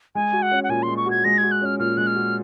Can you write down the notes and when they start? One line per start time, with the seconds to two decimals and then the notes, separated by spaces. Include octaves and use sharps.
0.15 G#3 G#5
0.33 F#4
0.42 F#5
0.51 C#4
0.64 F#5
0.69 A#2 G#5
0.83 C6
0.88 G#3
0.97 C#6
1.06 F#4 G#6
1.24 G#3 A#6
1.38 F#4 G#6
1.51 F#6
1.61 C#4 F6
1.79 A#2 F6
1.97 G#3 F#6
2.07 F6
2.15 F#4